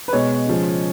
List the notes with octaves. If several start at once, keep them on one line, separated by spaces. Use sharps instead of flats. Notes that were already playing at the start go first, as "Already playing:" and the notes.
B4
B2 G#3 C#5
C#3 F3 G#3